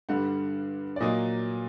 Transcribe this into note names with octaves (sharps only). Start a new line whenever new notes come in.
G2 D3 G3 F#5
D5
A#2 F#3 A#3 D#5